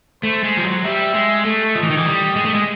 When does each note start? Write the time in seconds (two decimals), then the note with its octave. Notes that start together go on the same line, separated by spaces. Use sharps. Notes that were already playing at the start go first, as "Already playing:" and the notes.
0.23 A3 C5
0.43 G#3
0.57 F3
0.63 F#3
0.84 G3 E5
1.14 G#3
1.45 A3
1.75 F3 D#5
1.83 E3
1.90 D#3
1.97 E3
2.06 G3
2.36 G#3
2.45 A3
2.55 G#3